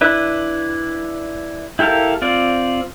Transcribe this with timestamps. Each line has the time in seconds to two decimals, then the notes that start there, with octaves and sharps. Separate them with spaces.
0.01 D4 E4 B4
1.79 E4 G4 A4 A#4 F5
2.22 C4 F4 D5